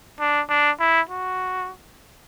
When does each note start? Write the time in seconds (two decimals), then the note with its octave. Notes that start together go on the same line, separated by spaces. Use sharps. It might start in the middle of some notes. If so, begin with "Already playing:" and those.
0.20 D4
0.50 D4
0.80 E4
1.09 F#4